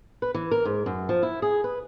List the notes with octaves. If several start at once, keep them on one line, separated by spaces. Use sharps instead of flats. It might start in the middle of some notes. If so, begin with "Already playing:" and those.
B4
E3
A#4
G#2
F#2
F3
E4
G#4
B4